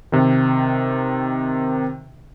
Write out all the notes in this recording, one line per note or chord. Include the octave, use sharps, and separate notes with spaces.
C3 D#3